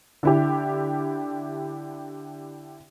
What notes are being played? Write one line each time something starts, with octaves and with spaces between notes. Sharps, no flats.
D3 E4 G4